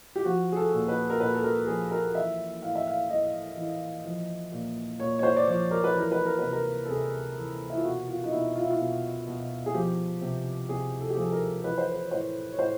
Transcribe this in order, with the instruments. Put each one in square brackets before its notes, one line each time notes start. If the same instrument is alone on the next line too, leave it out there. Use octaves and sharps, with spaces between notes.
[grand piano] G4
F3 F#4
G#4
A4
A#2
B4
A#4
A#2 B4
A4
A#4
F3 G#4
A#4
E3 E5
A2 F5
E5
F5
A2 D#5
E3
F3
A#2
A#2 C#5
C#5
C5
D5
F3 C#5
A#4
B4
E3 A#4
B4
A#4
C3 B4
A#4
A4
C3 G#4
E3
E4
F4
B2 F#4
F4
D#4
B2 E4
F4
E4
F4
B2
B2
G#4
F3 G4
C3
C3 G#4
A4
G4
F3 G#4
A4
A#4
E3 B4
C5
B4
C#5
A2 C5
C#5
A2 C5